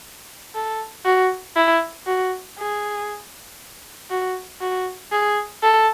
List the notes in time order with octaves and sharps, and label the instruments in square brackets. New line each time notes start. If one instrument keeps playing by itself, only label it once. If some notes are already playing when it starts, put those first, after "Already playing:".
[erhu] A4
F#4
E4
F#4
G#4
F#4
F#4
G#4
A4